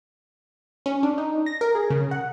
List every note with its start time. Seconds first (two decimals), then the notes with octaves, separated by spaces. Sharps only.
0.86 C#4
1.03 D4
1.18 D#4
1.46 A#6
1.61 A#4
1.75 G#4
1.90 C#3
2.11 F#5